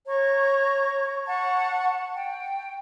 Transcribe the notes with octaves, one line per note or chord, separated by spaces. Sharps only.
C#5 A#5 C#6
F#5 A5 C#6
G5